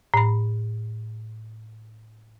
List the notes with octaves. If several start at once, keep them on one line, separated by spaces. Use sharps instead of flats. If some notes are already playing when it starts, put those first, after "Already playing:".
A2 B5